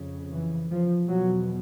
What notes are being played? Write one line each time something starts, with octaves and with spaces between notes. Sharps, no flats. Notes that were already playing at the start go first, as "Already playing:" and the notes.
Already playing: F2 C#3
E3
F3
E2 B2 F#3